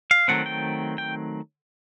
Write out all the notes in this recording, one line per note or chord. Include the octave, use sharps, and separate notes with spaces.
F5
D#3 F#3 A3 C4 F#5
G5
G5